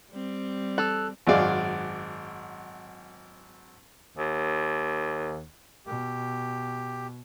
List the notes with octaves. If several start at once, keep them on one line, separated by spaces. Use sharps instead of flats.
G3 C4
A4 E6 F#6
G#1 F#2 F#3 G#3 D5 F5
D#2
B2 G4